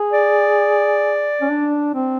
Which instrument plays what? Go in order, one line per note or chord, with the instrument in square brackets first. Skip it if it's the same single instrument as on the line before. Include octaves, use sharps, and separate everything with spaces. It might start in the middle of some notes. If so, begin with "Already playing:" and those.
Already playing: [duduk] G#4
[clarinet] D5
[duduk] C#4
D4
C4